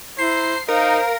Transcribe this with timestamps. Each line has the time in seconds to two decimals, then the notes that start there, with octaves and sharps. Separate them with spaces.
0.19 E4 C5 A#5 C7
0.69 D#4 A#4 C5 F5